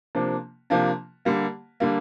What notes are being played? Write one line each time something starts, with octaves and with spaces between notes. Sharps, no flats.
C3 F3 A#3 D4
C3 F3 A#3 D4
D3 G3 A#3
D3 G3 A#3